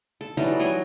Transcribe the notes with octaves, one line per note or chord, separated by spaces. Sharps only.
A4
E3 F#3 G3 D#4
F#3 D#5 G#5 C6